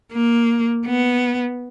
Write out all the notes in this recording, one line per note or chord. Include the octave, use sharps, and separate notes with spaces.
A#3
B3